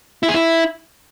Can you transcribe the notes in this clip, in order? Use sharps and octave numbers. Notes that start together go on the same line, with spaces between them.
E4
G#4
E4